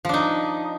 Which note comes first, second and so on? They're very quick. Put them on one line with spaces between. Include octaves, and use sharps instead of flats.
F3 D4 D#4